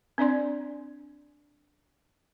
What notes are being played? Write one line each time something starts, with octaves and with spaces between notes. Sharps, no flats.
C4 D4 D5 C6